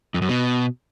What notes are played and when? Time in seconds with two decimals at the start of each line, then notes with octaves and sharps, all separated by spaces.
0.14 F2
0.22 F#2
0.29 B2